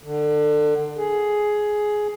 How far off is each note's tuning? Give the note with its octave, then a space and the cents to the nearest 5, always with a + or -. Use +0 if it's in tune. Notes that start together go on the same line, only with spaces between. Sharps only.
D3 +25
G#4 +10